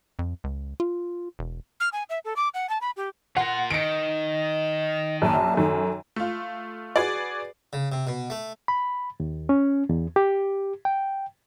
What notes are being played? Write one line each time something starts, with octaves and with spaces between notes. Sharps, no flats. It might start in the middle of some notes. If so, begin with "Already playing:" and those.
F2
C#2
F4
E1
F6
G#5
E5
A4
D6
F#5
A5
B5
G4
F4 A#4 F#5
D#3 D#5 C#7 D7
A#1 F#2 A5
F#2 D#3 A4
A3 F4
F#4 G#4 B4 D5
C#3
C3
B2
A3
B5
D#2
C#4
E2
G4
G5